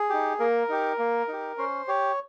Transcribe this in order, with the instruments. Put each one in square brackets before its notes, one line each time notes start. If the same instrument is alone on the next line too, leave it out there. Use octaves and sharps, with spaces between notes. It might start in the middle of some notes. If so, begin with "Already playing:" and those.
Already playing: [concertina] G#4
D#4 G4
A#3 A#4
D#4 G4
A#3
D#4 G4
C#4 C5
G4 C#5